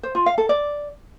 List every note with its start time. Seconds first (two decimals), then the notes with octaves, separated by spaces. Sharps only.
0.03 C5
0.15 F4
0.26 F5
0.38 A4
0.49 D5